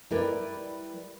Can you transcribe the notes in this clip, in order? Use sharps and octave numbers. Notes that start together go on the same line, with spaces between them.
G3 E4 A#4 B4 D5 G5